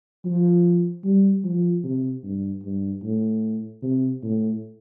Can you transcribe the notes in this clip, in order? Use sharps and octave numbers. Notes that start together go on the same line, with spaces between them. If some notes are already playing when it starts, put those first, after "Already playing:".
F3
G3
F3
C3
G2
G2
A2
C3
A2